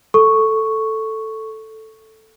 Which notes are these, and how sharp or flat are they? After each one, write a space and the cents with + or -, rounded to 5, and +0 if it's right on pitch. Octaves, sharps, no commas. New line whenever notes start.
A4 +0 C#6 +0